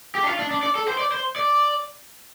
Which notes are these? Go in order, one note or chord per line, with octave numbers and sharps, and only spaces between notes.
G4
D4
F4
D4
D4
D5
A4
C5
D5
C5
D5